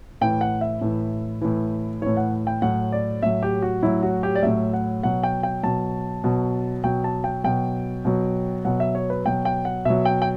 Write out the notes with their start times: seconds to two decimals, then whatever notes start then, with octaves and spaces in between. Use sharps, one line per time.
0.21 A2 E3 G5
0.41 F#5
0.61 E5
0.81 A2 E3
1.42 A2 E3
2.01 A2 E3 C#5
2.17 F#5
2.47 G5
2.62 A2 F#3 F#5
2.92 D5
3.23 A2 F#3 E5
3.43 G4
3.62 F#4
3.83 A2 F#3 E4
4.03 F#4
4.23 G4
4.36 D5
4.43 A2 F#3 E5
4.74 F#5
5.03 B2 F#3 F#5
5.23 G5
5.43 G5
5.63 B2 F#3 A5
6.24 B2 F#3
6.84 B2 F#3 G5
7.04 A5
7.24 G5
7.44 B2 F#3 G5
8.05 B2 F#3
8.65 B2 F#3 F#5
8.80 E5
8.95 C#5
9.10 B4
9.25 B2 F#3 G5
9.45 G5
9.65 F#5
9.85 B2 F#3 E5
10.05 G5
10.22 G5